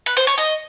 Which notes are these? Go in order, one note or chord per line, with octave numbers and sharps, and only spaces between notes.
B4
C5
C#5
D#5